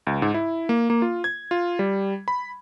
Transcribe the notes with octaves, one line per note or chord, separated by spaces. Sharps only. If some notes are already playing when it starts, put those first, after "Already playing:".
C#2
G#2
E4
A#3
A#3
F4
G#6
F4
G3
B5